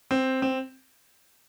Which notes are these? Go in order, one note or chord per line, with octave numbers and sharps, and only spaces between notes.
C4
C4